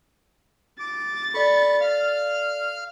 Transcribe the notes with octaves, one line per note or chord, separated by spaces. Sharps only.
D6 A6
A4 D5 B5 C#6
F5 F6